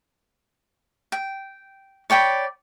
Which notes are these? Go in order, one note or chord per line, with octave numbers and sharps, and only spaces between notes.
G5
C#5 D5 G5 B5